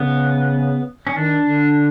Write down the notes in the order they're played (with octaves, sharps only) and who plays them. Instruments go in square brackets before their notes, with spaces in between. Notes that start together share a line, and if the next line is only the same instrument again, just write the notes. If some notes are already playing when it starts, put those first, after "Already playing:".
Already playing: [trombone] C#3 [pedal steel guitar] B3
[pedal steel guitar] C#4
[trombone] D#3 [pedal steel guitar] D4
[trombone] D3